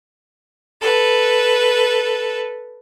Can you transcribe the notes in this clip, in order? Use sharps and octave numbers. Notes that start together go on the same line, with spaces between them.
A4 B4